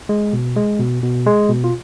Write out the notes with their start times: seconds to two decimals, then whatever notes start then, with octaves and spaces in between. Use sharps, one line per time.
0.09 G#3
0.33 B2
0.56 G#3
0.79 B2
1.03 B2
1.26 G#3
1.49 B2
1.64 F4